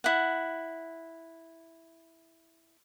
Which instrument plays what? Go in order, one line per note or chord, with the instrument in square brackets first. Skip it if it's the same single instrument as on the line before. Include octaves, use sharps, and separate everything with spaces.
[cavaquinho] E4 F#5